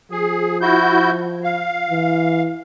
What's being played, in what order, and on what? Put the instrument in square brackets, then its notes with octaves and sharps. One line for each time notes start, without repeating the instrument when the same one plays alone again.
[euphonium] F3 [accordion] G#4
[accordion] E4 F#4 G6
F5
[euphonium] E3